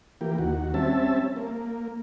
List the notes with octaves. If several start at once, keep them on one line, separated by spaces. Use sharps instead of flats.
E3 A#3 G4
D#2 F#4
G3 C4 C#4 E5 A5
A#3